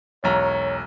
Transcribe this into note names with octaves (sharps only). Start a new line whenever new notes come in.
E1 B1 C#5 A#5